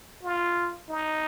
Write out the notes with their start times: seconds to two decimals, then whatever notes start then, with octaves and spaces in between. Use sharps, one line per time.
0.23 F4
0.89 D#4